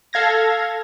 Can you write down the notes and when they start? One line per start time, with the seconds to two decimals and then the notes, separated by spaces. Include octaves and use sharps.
0.13 A4 F5 G#6 A#6